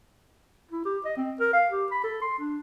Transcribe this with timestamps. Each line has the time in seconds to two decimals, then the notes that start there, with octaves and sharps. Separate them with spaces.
0.71 E4
0.85 G4
1.05 D#5
1.17 C4
1.40 A#4
1.53 F5
1.70 G4
1.91 B5
2.03 A4
2.21 C6
2.38 D4